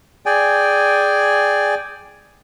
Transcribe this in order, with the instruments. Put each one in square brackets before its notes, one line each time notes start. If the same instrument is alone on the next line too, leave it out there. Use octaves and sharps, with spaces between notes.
[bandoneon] G#4 D5 G5 G#5